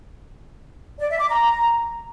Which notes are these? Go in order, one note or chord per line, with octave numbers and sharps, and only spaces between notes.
D5
E5
D6
A#5